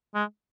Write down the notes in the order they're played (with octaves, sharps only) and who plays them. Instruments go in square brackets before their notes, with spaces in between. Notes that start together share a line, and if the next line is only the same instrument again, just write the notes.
[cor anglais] G#3